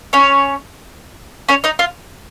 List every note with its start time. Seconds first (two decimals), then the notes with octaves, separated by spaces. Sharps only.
0.13 C#4 C#5
1.49 C#4 C#5
1.64 D#4 D#5
1.79 F4 F5